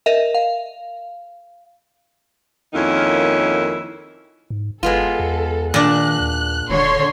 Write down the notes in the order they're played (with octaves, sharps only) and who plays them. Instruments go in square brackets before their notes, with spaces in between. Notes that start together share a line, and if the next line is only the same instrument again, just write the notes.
[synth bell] A#4 D#5 E5
F5
[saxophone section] F2 D#3 A#3 C#4 D#4 E4
[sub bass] G#2
[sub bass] G1 [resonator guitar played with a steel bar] G#3 B3 F4 [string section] A4
[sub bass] E2
[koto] A#2 D4 [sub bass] D#3 [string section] F#6
[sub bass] D#2
[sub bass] E1 [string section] D3 C#5 C6